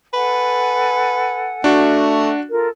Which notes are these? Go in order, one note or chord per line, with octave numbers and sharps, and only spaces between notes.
A4 B4 F#5 G#5
A3 D4 F#4
F4 A4 A#4